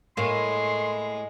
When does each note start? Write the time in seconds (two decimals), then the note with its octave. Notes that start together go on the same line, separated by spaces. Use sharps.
0.17 A2 G#3 A#3 C6